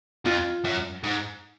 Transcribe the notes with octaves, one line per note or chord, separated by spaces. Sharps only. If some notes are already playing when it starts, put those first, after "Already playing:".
F2 F4
F#2
G#2